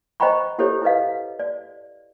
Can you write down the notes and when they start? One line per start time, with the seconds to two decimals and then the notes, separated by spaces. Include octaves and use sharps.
0.20 C5 D#5 G5 A#5 B5 C#6
0.59 E4 G4 A4 C5 C#5
0.82 E4 G#4 B4 D#5 F5
1.39 D5